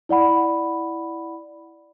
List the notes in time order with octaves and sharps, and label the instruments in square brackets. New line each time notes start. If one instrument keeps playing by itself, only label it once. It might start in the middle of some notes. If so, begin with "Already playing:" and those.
[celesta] E4 D5 F#5 B5